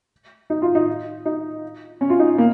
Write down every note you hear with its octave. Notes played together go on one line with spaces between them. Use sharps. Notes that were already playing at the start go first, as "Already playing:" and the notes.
D#4
F4
D#4
D#4
C#4
F4
D#4
A#3